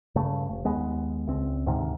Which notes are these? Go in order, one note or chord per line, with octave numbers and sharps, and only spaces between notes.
G2 C#3 A3
F1
D#2 G#3 B3
C#2 C4
D2 G#2 C3 D#3